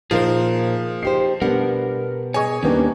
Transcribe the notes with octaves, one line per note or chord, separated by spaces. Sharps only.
A#2 F3 D#4 G#4 A#4 C5 F5
D#4 G4 C5 C7
B2 G3 B3 D4 A#4 F#5
G#4 C#5 D#5 G#5 C#6
D#2 D#3 G3 A#3 B3 C#4 D4